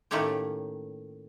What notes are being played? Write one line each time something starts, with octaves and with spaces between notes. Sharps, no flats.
A2 D#3 A3 A#3 C#4 G4